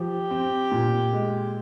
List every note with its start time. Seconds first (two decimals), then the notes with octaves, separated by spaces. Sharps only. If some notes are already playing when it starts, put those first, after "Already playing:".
Already playing: F3 G4
0.31 C4
0.72 A#2
1.13 G#3